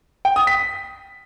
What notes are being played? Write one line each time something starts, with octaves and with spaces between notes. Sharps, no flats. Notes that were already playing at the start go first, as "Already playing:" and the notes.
G5
D#6
B6